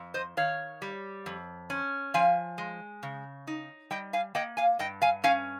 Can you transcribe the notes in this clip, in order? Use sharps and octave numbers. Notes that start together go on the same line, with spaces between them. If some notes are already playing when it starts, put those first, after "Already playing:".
Already playing: F2
C5 D#5
D#3 C#5 F5
G3
F2
C#4
F3 F5 G#5
G#3
C#3
D#4
G3 D#5 G5
F5 G#5
A#3 D#5 G5
F5 G#5
G2 D#5 G5
F5 G#5
C#4 F5 G#5